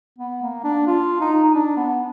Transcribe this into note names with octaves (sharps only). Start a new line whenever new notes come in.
B3
A#3
D4
F4
D#4
D#4
D4
B3